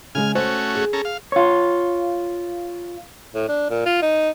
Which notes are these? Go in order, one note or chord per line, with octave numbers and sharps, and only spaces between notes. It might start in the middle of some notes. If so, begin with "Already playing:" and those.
C#3 G#3 G#5 F6
A3 C#4 F#4 C5
G#4
C#4 A4 A#5
F5
F4 C#5
A2
D4
A#2
F4
D#4